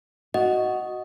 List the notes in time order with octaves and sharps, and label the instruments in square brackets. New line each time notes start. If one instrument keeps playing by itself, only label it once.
[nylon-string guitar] F#4 [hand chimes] D#5